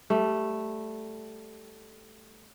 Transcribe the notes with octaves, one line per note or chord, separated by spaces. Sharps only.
G3 A3